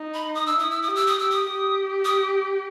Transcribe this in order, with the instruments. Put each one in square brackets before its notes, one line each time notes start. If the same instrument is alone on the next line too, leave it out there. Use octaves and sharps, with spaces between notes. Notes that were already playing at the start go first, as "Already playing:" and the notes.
Already playing: [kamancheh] D#4
[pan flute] B5
D#6
E6
[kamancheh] E4 [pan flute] D#6
[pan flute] E6
D#6
[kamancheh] G4
[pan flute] E6
D#6
[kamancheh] G4 [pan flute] E6
[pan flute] D#6
[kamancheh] G4
[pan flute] D#6